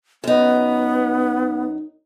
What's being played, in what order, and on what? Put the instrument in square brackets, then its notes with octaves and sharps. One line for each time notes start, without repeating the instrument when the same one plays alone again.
[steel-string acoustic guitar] F#2 D#4 [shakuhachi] B3